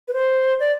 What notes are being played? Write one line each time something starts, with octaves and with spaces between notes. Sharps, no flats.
B4
C5
D5